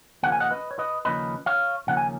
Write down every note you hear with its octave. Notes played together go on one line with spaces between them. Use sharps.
D#2 C#3 F3 A#3 C#4 F#5
G#5
D#5 F#5
B4 D#5
C#5
B4 D#5
D#2 C#3 F3 A#3 C#4 B4 D#5
C#5 F5
D#2 C#3 F3 A#3 C#4 F#5
G#5